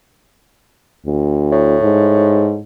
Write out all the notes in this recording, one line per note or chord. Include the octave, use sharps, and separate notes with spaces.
D2
A2
G#2